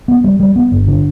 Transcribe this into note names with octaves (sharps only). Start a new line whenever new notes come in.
B3
G3
G3
B3
G1
D3